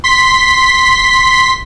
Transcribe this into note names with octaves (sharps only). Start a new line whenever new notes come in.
C6 B6